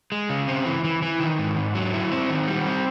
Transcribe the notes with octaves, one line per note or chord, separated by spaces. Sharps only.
G#3
C#3
C4
E3
E3
E3
D#3
G#2
G#2
F#3
E4
C4
D#3
G3
C4